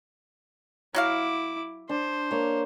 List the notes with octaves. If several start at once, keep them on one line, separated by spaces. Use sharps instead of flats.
F#3 E4 F#4 F5 D6
D4 C5
A#3 C#5